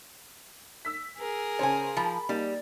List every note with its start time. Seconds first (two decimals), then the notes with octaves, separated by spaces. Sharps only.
0.85 E6 B6
1.18 G#4 A#4
1.59 C#3 C5 C#5 G#5
1.97 F3 B5
2.29 G3 A#3 D#4